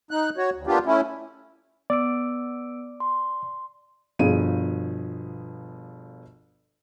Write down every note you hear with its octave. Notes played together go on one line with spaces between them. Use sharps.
D#4 F#6
F#4 C#5
D2
A#3 B3 D4 F4 G4
A3 C#4 E4
B3 D5 E6 D7
C6
G1 B2 F3 G#4 D#7